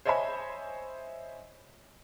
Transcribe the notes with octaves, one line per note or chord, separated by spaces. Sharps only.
C5 C#5 D#5 E5 G#5 B5